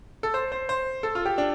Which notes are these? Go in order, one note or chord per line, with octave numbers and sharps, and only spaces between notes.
A4
C5
C5
C5
A4
F4
G4
D4